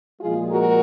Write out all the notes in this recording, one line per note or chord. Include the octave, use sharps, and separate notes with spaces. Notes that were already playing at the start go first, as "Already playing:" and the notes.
A#2 F3 G#3 F4 G#4
F#4 A#4